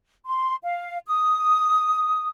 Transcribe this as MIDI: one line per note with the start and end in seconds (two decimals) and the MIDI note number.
0.25 0.56 84
0.63 0.98 77
1.07 2.28 87